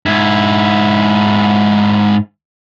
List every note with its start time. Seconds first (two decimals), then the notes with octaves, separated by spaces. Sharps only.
0.06 G#2 E4